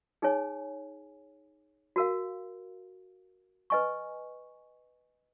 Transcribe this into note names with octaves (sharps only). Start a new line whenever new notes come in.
D#4 G#4 C#5 G#5
F#4 A#4 F5
B4 D#5 G#5 C#6